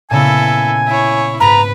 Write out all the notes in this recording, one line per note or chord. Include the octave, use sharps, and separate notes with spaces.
A#2 C#3 B3 E4 A4 G#5
E4 C#5
G#2 B4 A#5 B5